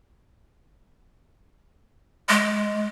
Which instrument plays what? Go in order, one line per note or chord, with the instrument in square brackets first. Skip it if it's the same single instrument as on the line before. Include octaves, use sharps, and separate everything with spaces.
[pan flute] G#3